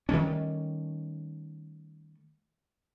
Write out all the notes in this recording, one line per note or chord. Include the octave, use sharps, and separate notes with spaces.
D#3 G3 A3 C#4